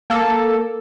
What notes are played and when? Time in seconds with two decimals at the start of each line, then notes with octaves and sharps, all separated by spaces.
0.10 A#3 A4